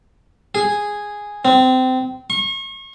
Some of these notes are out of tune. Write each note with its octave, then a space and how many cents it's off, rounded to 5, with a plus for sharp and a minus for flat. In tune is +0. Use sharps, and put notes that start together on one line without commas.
G#4 -5
C4 -25
C#6 -35